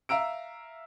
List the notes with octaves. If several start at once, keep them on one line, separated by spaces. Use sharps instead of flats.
E5 F5 A#5 E6 D7